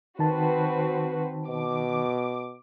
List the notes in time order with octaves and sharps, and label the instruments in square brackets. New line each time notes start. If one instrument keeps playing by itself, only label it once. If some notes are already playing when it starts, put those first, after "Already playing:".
[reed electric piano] D#3 D#4 A5 [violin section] C4 F#4 B4
[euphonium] B2 [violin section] D6